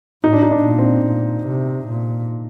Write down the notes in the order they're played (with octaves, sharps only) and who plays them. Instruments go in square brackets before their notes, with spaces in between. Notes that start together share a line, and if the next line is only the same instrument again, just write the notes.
[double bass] A2 [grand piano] D#4
[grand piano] D4
D#4
D4
[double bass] A#2
[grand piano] C4
[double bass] A#2
C3
A#2